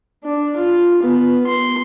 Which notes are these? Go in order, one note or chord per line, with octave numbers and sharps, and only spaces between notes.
D4
F4
B3
C6